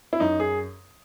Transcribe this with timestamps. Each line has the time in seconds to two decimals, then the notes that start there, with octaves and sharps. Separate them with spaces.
0.13 E4
0.20 F#2 D#4
0.40 G#4